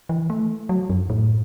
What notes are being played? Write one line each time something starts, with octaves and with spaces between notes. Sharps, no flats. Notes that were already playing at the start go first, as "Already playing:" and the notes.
E3
A3
F#3
F#2
A2